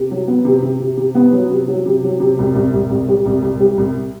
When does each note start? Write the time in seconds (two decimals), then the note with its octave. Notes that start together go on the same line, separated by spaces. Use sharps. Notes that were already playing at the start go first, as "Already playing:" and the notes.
Already playing: C3
0.11 F#3
0.28 B3
0.45 C3
0.63 C3
0.80 C3
0.97 C3
1.15 B3
1.32 F#3
1.50 C3
1.68 F#3
1.86 C3
2.03 F#3
2.20 C3
2.38 C2
2.55 C2
2.73 C2
2.90 C2
3.08 G3
3.25 C2
3.42 C2
3.60 G3
3.78 C2